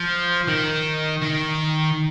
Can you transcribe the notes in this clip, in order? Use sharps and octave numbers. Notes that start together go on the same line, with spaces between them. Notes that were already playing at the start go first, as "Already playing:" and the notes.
Already playing: F3
D#3
D#3